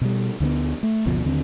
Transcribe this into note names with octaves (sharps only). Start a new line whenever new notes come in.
B2 G3
D2 D3 A3 B3
A3
F#1 D2 B2 F3
D#2 D3 C4